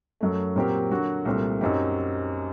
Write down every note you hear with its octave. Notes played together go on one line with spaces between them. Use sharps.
F#2 F#3 A3
A#2 F#3 C4 G4 A#4
D3 F#3 A#3 F#4
C2 A#2 A3 C4
F#2 F#3 C4 D#4 G4